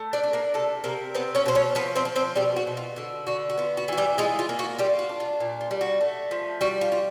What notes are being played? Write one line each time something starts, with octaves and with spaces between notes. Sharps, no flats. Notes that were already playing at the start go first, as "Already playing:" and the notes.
Already playing: A3
D4 D5
D4
A#3 A#4
C3 A3 A4
C3 A#3 A#4
B3 C4 B4
C#4 C#5
B2 C5
C#4 C#5
F3 B3 B4
C4 C5
F3
C4 C5
B2 G3 G4
F#4
B2
F4
D3 F#4
D3 F#4
F#4
B3 F4
F#4
E3 F#4
G3 G4
G#3 F4 G#4
F4
A#3
F#4
G3 F4 G4
F#4
D4
F4
A#2
F4
G3
F#4
A3
F3
G3 F#4
F4
F4